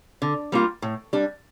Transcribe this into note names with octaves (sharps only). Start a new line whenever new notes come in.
D3
G3 A#3 F4
A2
G3 D4